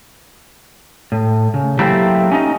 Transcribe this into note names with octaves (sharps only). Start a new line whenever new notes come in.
A2
C#3
F#3 A3 A#3 C4 E4 G4
C#4 D#4 D#5